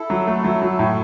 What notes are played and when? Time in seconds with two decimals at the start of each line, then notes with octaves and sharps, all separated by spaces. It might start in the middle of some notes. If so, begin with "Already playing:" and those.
Already playing: E4 A4
0.10 F#3
0.27 A3
0.44 F#3
0.62 F#3
0.79 A2